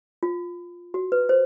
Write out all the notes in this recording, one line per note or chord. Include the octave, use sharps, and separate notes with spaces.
F4
F#4
B4
C5